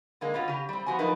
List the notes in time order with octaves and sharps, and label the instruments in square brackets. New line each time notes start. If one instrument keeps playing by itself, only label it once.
[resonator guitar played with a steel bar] D3 G#3 A#3
B2 C#4 F4 F#4
C#3 G4
G3 C4
F3 B3 F#4 C5 G#5
F3 F#3 A3 D#4 A#4 B4